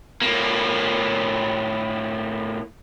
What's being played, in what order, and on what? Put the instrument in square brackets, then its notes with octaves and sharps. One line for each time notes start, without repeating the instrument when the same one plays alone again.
[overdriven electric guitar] A2 A#3